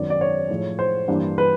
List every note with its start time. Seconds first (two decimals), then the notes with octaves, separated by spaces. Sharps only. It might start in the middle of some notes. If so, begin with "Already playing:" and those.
Already playing: G#1 F#2 D#3 F#3 B3 D5
0.10 D5
0.21 C#5
0.50 A2 F3 G#3
0.79 C5
1.08 G2 E3 G3 A#3 D4
1.38 B4